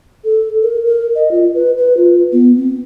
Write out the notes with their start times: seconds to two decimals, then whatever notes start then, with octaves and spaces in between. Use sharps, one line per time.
0.25 A4
0.63 A#4
0.86 A#4
1.15 D#5
1.31 F4
1.54 B4
1.78 B4
1.97 F4
2.33 B3
2.57 C4